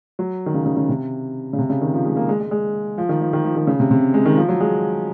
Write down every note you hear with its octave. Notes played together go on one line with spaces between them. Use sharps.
F#3
D#3
C#3
C#3
C#3
C3
C#3
C3
C#3
D#3
F3
G#3
A#3
G#3
G#3
G#3
F3
D#3
F3
D#3
F3
D#3
C#3
C3
C3
G#3
D#3
F3
F#3
G#3